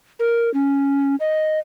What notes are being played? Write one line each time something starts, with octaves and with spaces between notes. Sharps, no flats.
A#4
C#4
D#5